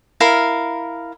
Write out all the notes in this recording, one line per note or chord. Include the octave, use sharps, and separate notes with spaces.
E4 A#4 F5